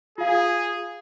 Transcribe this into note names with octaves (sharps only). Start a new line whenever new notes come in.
F4 G#4 F5